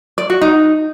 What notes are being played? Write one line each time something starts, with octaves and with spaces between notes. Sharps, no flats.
D5
F#4
D#4